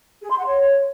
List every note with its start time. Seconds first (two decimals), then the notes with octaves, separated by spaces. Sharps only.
0.22 G#4
0.30 C6
0.38 F#5
0.46 C#5